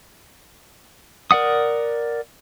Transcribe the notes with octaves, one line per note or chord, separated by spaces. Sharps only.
A#4 D5 F#5 D#6